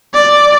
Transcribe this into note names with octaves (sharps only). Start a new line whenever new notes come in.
D5